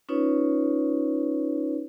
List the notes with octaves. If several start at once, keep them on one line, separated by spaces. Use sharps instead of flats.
C#4 D#4 F4 B4 C#5